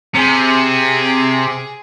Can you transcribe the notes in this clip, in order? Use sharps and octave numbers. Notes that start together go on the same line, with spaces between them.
C3 G#4